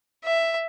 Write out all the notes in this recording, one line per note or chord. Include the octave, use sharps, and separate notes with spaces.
E5